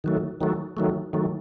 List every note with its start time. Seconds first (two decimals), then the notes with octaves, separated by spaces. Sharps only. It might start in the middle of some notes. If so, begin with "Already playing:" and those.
0.04 D#3 F#3 A3
0.41 D#3 F#3 A3
0.77 D#3 F#3 A3
1.13 D#3 F#3 A3